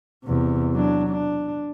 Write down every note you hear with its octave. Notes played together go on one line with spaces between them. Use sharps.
E2 C3
F#3 D4
D4